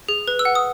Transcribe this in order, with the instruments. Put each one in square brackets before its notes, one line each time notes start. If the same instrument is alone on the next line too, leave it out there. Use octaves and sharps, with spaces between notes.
[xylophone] G#4
B4
E6
F#5
D#6